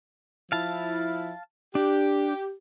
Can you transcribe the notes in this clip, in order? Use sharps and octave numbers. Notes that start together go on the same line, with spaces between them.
F3 E4 F5 A5
D4 G4